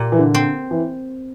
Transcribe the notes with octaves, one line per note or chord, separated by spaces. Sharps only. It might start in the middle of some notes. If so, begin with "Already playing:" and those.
Already playing: A#2 G4
E3
D3
C4
E3